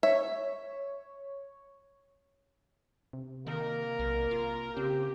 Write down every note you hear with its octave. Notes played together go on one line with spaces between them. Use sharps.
C#5 E5
C3
D#3 A#3 A#4
B1
F4
C#3 C4 G4